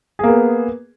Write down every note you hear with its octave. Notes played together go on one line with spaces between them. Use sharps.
A#3 B3 G#4